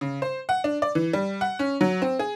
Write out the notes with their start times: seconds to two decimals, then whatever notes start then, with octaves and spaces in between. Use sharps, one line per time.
0.01 C#3
0.22 C5
0.49 F#5
0.64 D4
0.82 D5
0.95 E3
1.13 G3
1.41 F#5
1.59 C#4
1.81 F#3
2.02 C4
2.19 G#4